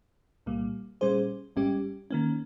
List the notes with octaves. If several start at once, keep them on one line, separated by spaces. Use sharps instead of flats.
C2 A#2 G3 A#3
A#2 G3 C#4 G#4 C5
G#1 G#2 G3 C#4 G4
D#3 A#3 C#4